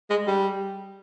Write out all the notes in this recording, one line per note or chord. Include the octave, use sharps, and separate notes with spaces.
G#3
G3